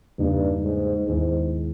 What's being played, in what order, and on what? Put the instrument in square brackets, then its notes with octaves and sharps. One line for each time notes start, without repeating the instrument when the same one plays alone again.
[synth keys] E2 C#3 G3 A#3 D#4 [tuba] G2
[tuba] G#2
[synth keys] D#2 D#3 G#3 B3 E4 [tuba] G#2